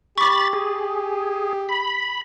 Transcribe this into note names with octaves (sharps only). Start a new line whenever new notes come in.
G4 B5 C#6 D6 A6
G#4
B5